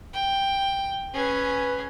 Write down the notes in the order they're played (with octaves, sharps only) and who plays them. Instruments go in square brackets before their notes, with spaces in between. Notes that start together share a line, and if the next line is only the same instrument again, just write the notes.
[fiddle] G5
[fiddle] C#4 G#4 [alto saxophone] B4